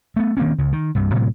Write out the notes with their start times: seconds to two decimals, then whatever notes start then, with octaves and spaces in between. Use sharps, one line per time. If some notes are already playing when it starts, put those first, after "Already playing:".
0.16 A3 B3
0.37 D#3 A#3 C4 C#4
0.58 C#2 C#3
0.72 D#3
0.95 C2 G2 C3
1.14 A2 C3 F#3 G#3